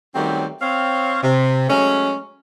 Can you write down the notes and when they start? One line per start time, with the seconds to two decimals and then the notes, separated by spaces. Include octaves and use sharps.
0.15 D#3 F#3 G3 A3 C4 C#4
0.62 C4 C#5 F5
1.23 C3
1.69 F#3 G#3 A3 C#4